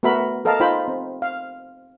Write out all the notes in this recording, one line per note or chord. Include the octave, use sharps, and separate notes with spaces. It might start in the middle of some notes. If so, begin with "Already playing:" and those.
A3 B3 F#4 A#4 E5 B5
A4 A#4 D#5 F5 A5
D#4 F4 C5 G5 B5
C4
F5